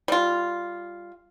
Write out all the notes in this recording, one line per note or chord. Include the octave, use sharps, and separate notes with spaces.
G3 F4